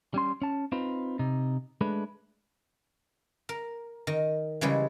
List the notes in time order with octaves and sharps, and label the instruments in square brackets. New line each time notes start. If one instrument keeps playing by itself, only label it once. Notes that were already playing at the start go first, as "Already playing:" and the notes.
[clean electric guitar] G3 C#4 C6
C#4 A5
C4 D#4 F4 B4
C3 D#4
G#3 A3 D4 B4
[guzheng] A#4
D#3
C#3 E3 G3 G#3